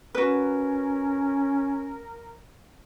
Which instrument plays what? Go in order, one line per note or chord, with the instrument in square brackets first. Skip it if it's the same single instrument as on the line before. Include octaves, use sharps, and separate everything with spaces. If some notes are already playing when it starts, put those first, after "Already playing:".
[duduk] C#4 [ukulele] F#4 B4 [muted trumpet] A#4